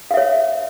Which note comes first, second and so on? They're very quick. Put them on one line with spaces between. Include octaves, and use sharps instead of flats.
F5 E5 C#5